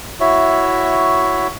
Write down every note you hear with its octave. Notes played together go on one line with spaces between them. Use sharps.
E4 F#4 C#5 E5